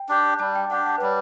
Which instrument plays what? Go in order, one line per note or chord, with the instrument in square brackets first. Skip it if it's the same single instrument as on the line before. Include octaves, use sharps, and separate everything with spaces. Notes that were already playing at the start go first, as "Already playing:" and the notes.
Already playing: [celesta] G5
[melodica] D4 G4
[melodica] G3 [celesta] A5
[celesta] G5
[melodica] D4 G4 [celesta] F#5
[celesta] F#5
B4
[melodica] G3 [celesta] C#5